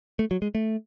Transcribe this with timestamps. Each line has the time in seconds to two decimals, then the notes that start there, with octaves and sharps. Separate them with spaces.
0.19 A3
0.31 F#3
0.42 G#3
0.55 A3